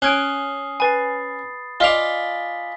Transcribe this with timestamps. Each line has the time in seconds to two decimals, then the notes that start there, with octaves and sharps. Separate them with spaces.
0.02 C#4 D#6 F#6 G#6 C7 D7
0.80 B4 G#5 B5 A6 C7
1.80 F4 D5 D#5 F5 G#5 B6 F7